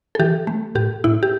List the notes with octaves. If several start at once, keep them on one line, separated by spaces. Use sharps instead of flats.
A4
E3 G4
A3
A2 G4
A2 E4
G4